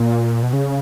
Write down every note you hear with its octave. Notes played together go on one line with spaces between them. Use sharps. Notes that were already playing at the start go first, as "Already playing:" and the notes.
Already playing: A#2
B2
C#3